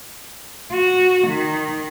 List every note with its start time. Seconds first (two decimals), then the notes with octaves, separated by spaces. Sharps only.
0.71 F#4
1.28 D#3